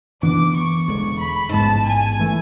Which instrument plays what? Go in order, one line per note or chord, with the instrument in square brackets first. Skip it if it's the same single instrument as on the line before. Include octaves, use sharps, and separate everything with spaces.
[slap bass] F#2 E3 B3 D4 [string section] D6
[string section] C#6
[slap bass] E1 E2 D3 G#3
[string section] B5
[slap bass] A1 G#2 G#3 B3 [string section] A5
[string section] G#5
[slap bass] E3 A3